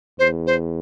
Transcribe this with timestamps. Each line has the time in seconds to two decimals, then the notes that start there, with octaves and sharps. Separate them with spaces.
0.19 E2 C5
0.47 C5